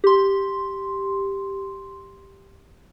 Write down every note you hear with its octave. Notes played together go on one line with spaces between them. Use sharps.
G4 C6